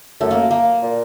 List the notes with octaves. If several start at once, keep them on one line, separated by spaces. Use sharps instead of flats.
F#2 A3
A#3
A#3
A#2